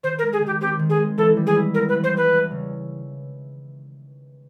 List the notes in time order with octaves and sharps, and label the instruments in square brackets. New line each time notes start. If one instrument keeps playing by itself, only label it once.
[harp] D#3 [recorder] C5
[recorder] A#4
[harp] G#3
[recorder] G#4
[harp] D#3 [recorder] G4
[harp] C4 [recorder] G4
[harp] D#3
[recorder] G#4
[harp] G#3
[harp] E3 [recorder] A4
[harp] G3
[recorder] G#4
[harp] E4
[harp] B3 [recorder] A#4
[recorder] B4
[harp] E3
[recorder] C5
[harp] G3 [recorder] B4
[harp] E2
C#3